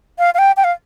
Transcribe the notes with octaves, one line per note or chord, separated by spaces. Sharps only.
F5
F5
G5
G5
F5